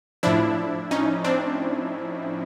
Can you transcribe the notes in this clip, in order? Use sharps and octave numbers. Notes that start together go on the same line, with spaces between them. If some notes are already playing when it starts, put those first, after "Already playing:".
A2 F3 D4 E4
C#4 D#4
C4 D4